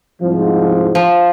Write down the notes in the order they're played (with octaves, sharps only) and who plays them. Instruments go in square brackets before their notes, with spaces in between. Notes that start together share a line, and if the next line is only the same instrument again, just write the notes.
[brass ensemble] C2 G#2 F3
[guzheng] F3